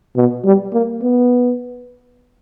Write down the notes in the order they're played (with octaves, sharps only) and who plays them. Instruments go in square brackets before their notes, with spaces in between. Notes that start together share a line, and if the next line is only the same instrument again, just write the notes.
[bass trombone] B2
G3
A#3
B3